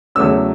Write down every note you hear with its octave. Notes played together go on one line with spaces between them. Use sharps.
E2 C#3 F#3 A3 C#4 E6